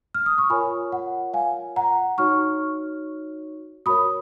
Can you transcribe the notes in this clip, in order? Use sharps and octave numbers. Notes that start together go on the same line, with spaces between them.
F6
D#6
C#6
F4 A#4 C#5 G#5 B5
F#5
F5 G#5
F#5 A#5
D#4 F#4 C#5 C#6 F6
F#4 A#4 C#5 B5 D#6